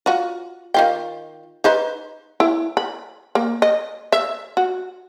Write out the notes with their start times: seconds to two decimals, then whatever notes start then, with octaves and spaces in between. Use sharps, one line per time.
0.06 F4 F#4
0.74 D#3 F4 G5
1.64 D#4 B4 C5
2.40 E4
2.77 B5
3.35 A#3
3.62 D#5
4.12 E5
4.57 F#4